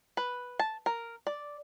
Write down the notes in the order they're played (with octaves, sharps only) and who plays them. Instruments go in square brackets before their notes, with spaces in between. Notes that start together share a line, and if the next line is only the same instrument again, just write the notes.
[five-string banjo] B4
A5
A#4
D5